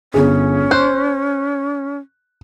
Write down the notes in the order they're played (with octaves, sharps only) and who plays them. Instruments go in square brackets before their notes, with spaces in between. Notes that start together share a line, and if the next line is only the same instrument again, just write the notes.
[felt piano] G1 G#4 [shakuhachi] C#4
[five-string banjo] C5 [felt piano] F#6